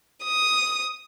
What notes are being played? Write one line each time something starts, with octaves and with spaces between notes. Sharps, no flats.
D#6